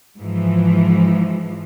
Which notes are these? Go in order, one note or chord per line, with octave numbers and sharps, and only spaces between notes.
G#2 E3 F3